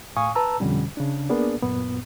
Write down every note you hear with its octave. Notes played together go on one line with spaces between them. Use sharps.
A2 F5 G#5 C#6 D#6
B4 A5 A#5 E6
F2 B2 D3 G3 C#4
C#3 D4
A#3 B3 D4 G#4 A#4 D5
F#2 A#2 B3